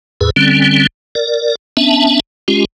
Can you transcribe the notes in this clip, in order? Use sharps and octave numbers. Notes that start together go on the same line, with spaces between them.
E2 A2 G#4 B4
D3 G3 C4 C#4
A#4 D5
B3 C#4 D4 E5 A5
G#3 C#4 F4 G4